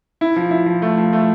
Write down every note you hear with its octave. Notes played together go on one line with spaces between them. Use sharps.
E4
F3
E4
F3
A3
F3
A3